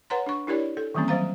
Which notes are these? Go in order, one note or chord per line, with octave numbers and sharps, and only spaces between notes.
B4 C#5 F#5 A#5 C6
D4 C#6
D4 E4 G4 A#4 C#5 D5
A4
D#3 E3 G3 A#3 C4 C#4
F#3 G3 C5 F5 A#5